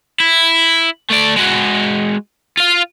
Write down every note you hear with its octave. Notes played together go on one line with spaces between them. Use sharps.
E4
A3 D5
G#3 F#4
F4 F5